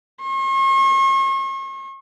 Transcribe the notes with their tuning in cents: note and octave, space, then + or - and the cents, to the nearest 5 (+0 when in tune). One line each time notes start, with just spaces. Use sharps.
C#6 -45